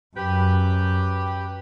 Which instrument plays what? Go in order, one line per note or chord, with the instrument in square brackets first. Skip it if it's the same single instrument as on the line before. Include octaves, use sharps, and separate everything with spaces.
[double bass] F#2 [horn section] G4 B4